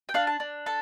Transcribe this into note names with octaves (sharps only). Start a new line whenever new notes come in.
G5
D4 F5
A5
D4
A4 A5